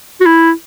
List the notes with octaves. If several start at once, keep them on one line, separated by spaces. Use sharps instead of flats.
F#4
E4